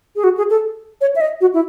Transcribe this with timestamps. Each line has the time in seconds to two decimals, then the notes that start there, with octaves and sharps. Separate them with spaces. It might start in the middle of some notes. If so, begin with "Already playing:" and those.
0.16 G#4
0.24 F#4
0.37 G#4
0.50 A4
1.01 C#5
1.16 E5
1.21 D#5
1.41 F#4
1.54 E4